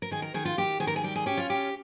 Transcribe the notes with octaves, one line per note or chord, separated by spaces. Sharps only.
A#4
D#3 G#4
A#4
D#3 G#4
F4
D#3 G4
D#3 G#4
A#4
G#4
G3 G4
G#4
C#4 G4
F4
F4 G4